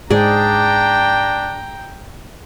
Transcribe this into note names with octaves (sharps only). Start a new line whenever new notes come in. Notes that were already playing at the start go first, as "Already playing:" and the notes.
G#2 D4 G#4 D5 G5 A#5